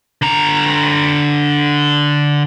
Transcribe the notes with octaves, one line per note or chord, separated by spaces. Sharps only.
D3 A#5